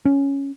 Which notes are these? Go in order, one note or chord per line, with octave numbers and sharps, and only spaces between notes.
C#4